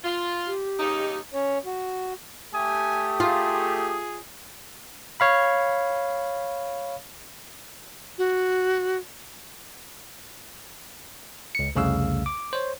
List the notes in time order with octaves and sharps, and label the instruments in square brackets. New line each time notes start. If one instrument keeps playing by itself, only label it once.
[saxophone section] F4
[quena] G4
[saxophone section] D#2 C#3 D#4
[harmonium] C#4 C#5
F#4
[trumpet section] A3 G4 [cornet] G#5 [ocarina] D#6
[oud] F4 [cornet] G#4
[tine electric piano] C#5 F5 B5
[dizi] F#4
[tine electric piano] C#2 C#7
C2 F2 C#3 A3 F5 E6
D6
C5 C#5